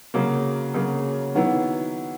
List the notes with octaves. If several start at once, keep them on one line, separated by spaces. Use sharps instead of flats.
C#3 F#3 A#3
C#3 F#3 A#3
D#3 F#3 B3 E4